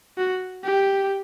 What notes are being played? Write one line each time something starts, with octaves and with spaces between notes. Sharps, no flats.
F#4
G4